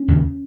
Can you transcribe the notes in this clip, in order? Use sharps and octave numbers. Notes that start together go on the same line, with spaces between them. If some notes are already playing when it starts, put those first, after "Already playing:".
Already playing: C#4
D#2 C#3